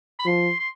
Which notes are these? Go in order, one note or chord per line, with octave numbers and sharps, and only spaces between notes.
B5
F3 C6
C6